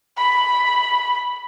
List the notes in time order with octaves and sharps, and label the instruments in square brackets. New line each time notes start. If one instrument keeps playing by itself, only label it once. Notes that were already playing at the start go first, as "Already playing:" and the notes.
[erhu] B5